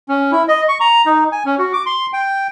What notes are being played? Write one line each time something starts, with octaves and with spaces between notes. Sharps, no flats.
C#4
E4
D#5
C#6
A#5
D#4
G#5
C#4
F#4
D6
C6
G5